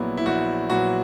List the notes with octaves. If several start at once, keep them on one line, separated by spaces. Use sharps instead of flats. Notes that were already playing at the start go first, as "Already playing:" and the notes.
Already playing: A#1 A#2 F#3 B3 E4
E4
A#1 F#4
A#2 F#3 B3 F#4